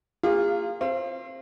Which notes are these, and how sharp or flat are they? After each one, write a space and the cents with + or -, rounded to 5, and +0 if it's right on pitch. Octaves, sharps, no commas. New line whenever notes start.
A#3 -20 F4 +0 G#4 -40
C4 +25 F5 -30